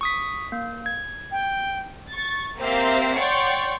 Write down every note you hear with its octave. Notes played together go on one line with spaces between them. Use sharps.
C#6 D#6 B6
A#3
G#6
G5
C#6 A6
A#3 C4 G4 C5 E5 F5
C#5 D5 F#5 G5 C6 C#6